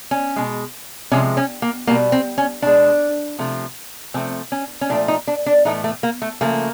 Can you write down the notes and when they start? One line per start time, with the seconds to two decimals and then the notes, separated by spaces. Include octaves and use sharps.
0.11 C#4
0.36 B2 G#3
1.11 C3 F3 G#3 C#4
1.37 C#4
1.62 A#3
1.87 B2 G3 A#3
2.12 C4
2.38 C#4
2.62 B2 G#3 D4
3.39 C3 F3 A3
4.14 C3 F3 A3 C4
4.52 C#4
4.81 C#4
4.89 A#2 F3 A3 D4
5.08 D#4
5.27 D4
5.46 D4
5.65 A2 E3 A3 D#4
5.84 A3
6.03 A#3
6.22 A3
6.41 C#3 F3 A3 A#3